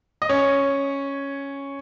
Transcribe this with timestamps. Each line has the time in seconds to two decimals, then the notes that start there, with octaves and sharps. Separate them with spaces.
0.22 D#5
0.29 C#4 C#5